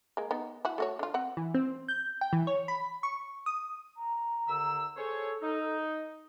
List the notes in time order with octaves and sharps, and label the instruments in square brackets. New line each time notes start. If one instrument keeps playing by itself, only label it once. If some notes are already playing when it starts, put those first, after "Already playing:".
[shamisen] G#3 A#3
B3 D#4
E4 F#4
A3 F#4 C#5
D3 F4
C4 F#5
[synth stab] E3
C4
G6
G5
E3
C#5
B5
C#6
D#6
[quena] A#5
[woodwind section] D#2 D3 E6
[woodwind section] G#4 C5 C#5 [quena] A4
[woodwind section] D#4